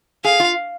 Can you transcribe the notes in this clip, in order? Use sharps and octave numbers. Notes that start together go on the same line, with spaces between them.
G#4 F5
F4